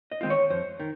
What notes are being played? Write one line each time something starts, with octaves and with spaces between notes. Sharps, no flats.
D#5
D#3 G#3 C4 F4
C#5
F2 C5
D#3